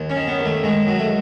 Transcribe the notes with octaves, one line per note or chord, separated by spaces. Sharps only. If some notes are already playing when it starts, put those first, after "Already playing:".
Already playing: D#2
C#4
D#3
B3
D#2
A3
D#3 G#3
F#3
A3